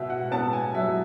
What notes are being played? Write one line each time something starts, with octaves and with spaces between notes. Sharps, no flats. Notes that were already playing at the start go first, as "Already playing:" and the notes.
Already playing: B2 E5
F#5
B3 A5
G#5
F#3 E5